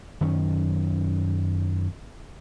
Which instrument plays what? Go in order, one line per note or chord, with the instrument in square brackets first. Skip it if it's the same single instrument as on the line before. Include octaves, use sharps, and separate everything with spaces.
[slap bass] F#2 D#3 C#4